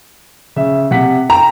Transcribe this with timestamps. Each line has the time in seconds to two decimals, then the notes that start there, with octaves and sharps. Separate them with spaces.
0.56 C#3 E5
0.91 C3 F#5 B6
1.30 G5 A#5